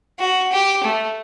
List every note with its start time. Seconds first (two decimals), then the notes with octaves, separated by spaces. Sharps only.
0.19 F#4
0.53 G4
0.84 A3